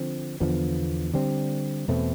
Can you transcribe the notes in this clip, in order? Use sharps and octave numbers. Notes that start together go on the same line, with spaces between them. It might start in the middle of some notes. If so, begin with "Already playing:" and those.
Already playing: D3 F3 C4
E2 D3 F3 B3
D3 G3 C4
E2 B2 A3 C4